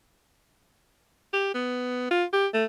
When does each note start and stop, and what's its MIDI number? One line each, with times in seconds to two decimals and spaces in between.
1.33 1.52 67
1.54 2.07 59
2.11 2.25 65
2.33 2.47 67
2.54 2.64 57